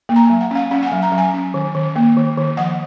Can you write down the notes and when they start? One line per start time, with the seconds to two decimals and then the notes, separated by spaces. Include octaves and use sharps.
0.09 A#3
0.16 A#5
0.24 G#5
0.30 F#3
0.41 F#5
0.51 C#4 F5
0.71 C#4 F#5
0.83 F#5
0.87 G#5
0.92 F#3
1.03 A#5
1.12 F#3
1.18 G#5
1.34 C#4
1.54 D#3
1.75 D#3
1.96 A#3
2.17 D#3
2.37 D#3
2.57 F3 F#5